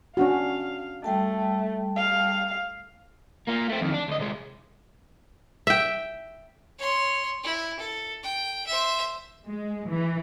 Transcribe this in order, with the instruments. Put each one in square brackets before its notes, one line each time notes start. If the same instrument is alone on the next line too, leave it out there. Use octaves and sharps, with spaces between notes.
[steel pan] C#4 D4 F#4 [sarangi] F5
[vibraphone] G3 G5 A5 [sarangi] A3
[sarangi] F5
[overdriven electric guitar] A#3 F4
A3 C4
F2 D#3
D4
D2 D#5
C3 G#3
[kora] E5 G5
[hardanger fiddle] C#5 C6
E4
A4
G5
C5 E5
[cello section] G#3
E3